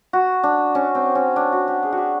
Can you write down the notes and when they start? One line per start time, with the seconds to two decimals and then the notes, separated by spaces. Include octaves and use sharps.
0.13 F#4
0.43 D4
0.75 C#4
0.95 C4
1.15 C#4
1.36 D4
1.52 F#4
1.68 G4
1.83 G#4
1.92 F#4
1.98 G4